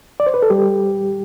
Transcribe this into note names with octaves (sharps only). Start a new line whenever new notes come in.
D5
C5
B4
A4
G3 G4